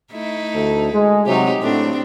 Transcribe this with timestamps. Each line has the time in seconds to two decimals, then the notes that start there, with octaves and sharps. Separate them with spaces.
0.13 A3 D#4 E4
0.55 D2 A4
0.92 G#3
1.26 C3 F#3 D#4 G4
1.62 A2 A3 C4 D4